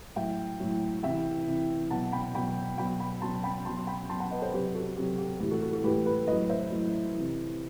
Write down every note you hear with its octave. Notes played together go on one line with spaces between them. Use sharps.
A2 F#3 E5 G5
A2 F#3
C3 E3 E5 G5
C3 E3
B2 F#3 F#5 A5
G5 B5
B2 F#3 G5 B5
B2 F#3 G5 B5
G5 B5
B2 F#3 A5 C6
G5 B5
B2 F#3 A5 C6
C6
G5 B5
B2 F#3 A5 C6
F#5 A5
B4 D#5
A4 C5
C3 F#3 G4 B4
F#4 A4
C3 F#3 G4
G4
A2 E3 G4
F#4 A4
F#4 A4
F#4 A4
A2 E3 G4 B4
G4 B4
A2 F#3 B4 D#5
C5 E5
A2 F#3
C3 E3